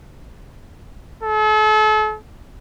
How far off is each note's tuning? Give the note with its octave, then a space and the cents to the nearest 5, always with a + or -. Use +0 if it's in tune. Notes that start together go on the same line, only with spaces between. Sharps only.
A4 -40